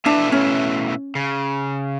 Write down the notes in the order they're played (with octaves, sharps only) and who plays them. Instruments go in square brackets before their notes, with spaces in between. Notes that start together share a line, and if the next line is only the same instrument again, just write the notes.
[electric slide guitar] B2 A3 E4 B4 E5 [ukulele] D4
[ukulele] C#4
[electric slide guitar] C#3